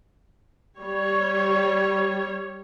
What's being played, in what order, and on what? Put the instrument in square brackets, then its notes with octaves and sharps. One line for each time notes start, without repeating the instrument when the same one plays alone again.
[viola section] G3 C#5